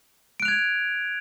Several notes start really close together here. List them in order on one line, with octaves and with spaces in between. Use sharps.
D7 F#6 F7 G#6